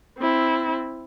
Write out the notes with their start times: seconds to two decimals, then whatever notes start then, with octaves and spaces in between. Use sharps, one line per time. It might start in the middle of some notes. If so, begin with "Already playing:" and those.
0.19 C4 E4